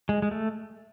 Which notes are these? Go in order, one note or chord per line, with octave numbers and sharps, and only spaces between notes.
G#3
G#3
A3